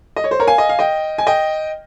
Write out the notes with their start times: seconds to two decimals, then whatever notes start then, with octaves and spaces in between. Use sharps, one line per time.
0.16 D#5
0.24 C#5
0.31 C5
0.39 A#4 C#5
0.47 F5 G#5
0.58 D#5
0.69 F5
0.79 D#5 G5
1.18 G#5
1.27 D#5 G5